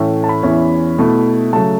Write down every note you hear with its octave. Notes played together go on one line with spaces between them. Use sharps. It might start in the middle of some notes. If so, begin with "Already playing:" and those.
Already playing: A2 E3 A3 C#4
A5
B5
E2 E3 C#4 E4
B2 A3 E4
C#3 F#3 A3 A5